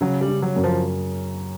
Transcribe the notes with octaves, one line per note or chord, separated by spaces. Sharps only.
C#3 F#3
G3
C#3
F#3
F#2
F3